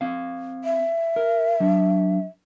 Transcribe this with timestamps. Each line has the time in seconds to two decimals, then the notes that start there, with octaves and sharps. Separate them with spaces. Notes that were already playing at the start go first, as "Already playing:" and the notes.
0.01 C4 F5
0.64 E5
1.16 A#4
1.60 F#3 D4